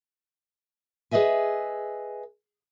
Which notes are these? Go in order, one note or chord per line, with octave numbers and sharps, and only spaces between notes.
G#4 B4 D#5 E5 G#5